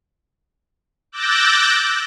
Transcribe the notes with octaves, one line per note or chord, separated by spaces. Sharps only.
D6 E6 F#6 G6 A6 A#6